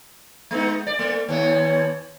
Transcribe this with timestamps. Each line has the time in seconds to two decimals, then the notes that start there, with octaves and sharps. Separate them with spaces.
0.51 G#3 B3 D#4
0.87 D5
0.99 A3
1.29 D#2 B3 C#5